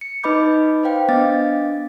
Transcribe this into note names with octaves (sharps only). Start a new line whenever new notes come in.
C#7
D#4 B4 D#5 B5 D6 G6
B4 C5 F5 G5
B3 D4 D#5 F5 D6 A6